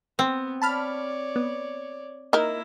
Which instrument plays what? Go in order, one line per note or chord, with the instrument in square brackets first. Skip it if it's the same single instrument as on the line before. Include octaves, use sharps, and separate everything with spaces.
[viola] B3 [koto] C4
[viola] C#5 D5 [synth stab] A5 B5 F6
[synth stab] B3
[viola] A#3 E4 [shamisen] D#4 A#4